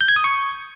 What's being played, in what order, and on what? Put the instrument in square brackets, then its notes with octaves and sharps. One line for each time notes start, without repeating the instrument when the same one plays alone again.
[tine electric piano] G6
G#6
D#6
C#6